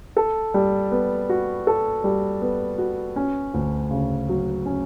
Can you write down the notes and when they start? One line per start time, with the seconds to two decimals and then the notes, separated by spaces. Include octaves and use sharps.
0.17 A4
0.54 G3
0.92 B3
1.29 F#4
1.67 A4
2.04 G3
2.42 B3
2.78 F#4
3.16 C#4
3.54 D2
3.91 C#3
4.29 F#3
4.66 C#4